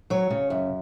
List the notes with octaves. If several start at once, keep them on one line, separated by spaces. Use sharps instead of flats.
F#3 C#5
C#3
F#2